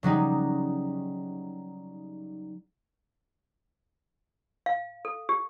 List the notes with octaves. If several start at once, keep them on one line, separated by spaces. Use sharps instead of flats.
C#3 F#3 G3 D#4
F5
A4
G4